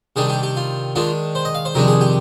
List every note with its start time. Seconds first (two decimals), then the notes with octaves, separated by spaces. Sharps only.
0.16 C3 D#3 G3 D4 G#4
0.29 G4
0.43 G4
0.56 F4
0.95 D#3 G#3 D4 F4
1.35 C5
1.45 D#5
1.55 F5
1.65 C5
1.75 F2 C3 D#3 G#3 D4 A#4
1.88 G#4
2.01 G4